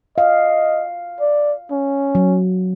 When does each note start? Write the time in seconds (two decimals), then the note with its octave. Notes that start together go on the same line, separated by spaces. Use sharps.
0.18 D#5 F5
1.21 D5
1.71 C#4
2.15 F#3